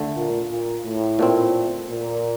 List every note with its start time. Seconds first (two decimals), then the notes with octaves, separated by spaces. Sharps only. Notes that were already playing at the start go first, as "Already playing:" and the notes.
Already playing: D2 D3 A3
0.16 A#2
0.50 A#2
0.85 A2
1.19 A#2 A3 C4
1.89 A#2